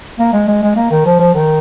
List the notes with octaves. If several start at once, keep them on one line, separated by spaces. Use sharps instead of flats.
A#3
G#3
G#3
G#3
A#3
D#3
F3
F3
D#3